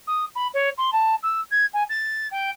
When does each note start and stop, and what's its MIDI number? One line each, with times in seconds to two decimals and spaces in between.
0.07 0.24 87
0.35 0.47 83
0.54 0.69 73
0.77 0.90 84
0.92 1.15 81
1.23 1.40 88
1.50 1.65 92
1.73 1.83 80
1.89 2.27 93
2.31 2.50 79